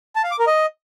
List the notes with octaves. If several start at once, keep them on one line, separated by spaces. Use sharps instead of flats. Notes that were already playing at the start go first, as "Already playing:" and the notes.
A5
F5
D6
A#4
D#5